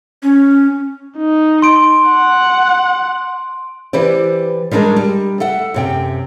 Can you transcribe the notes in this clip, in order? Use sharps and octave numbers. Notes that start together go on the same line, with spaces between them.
C#4
D#4
C6 D7
F#5
E3 G4 B4 C5 D5
G3 G#3 D4 G#4 A#4
G3
A4 E5 F#5
F#2 C3 G5